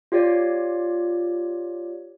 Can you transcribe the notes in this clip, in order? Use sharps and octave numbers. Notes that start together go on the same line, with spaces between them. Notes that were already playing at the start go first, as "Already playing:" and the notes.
F4 G4 C#5 D5